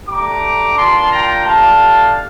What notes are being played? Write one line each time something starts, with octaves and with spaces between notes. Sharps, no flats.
A3 D4 G4 A#5 D6
A#3 D4 F4 A5 C6
G5 A#5
A3 D4 G4 F5 A5